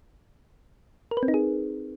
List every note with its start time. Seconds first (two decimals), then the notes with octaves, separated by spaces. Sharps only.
1.11 A#4
1.17 B4
1.23 C4
1.28 D#4
1.34 G#4